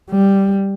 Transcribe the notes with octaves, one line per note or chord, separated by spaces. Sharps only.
G3